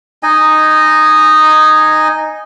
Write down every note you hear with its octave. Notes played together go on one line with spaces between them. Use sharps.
D#4 D#5 G#5